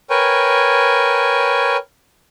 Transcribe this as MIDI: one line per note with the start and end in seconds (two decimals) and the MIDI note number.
0.10 1.77 70
0.10 1.77 71
0.10 1.77 73
0.10 1.77 79
0.10 1.77 80